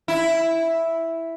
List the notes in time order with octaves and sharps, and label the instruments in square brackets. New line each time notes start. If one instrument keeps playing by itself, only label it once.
[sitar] E4